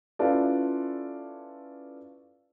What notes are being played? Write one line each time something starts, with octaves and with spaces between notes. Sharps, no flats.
C#4 E4 F4 A4 B4 D5